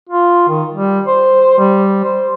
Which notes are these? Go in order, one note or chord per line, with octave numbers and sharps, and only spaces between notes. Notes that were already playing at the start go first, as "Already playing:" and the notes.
F4
D#3
G3
C5
G3
C5